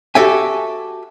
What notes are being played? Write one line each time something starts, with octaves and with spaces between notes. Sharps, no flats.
F#4 G4 A4 E5 G5 G#5